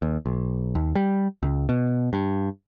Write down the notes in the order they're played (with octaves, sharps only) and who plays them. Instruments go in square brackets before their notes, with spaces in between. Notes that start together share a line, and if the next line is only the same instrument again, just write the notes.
[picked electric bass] D#2
B1
D#2
G3
C#2
B2
G2